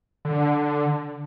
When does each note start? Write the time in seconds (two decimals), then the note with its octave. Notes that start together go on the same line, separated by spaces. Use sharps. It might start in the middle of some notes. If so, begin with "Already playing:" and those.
0.25 D3